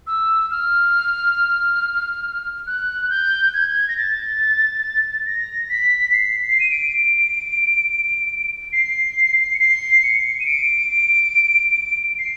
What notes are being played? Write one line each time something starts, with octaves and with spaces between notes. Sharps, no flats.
E6
F6
F#6
G6
G#6
A#6
A6
A#6
B6
C7
C7
D#7
D7
C7
C#7
C7
C#7
D#7
D7
C7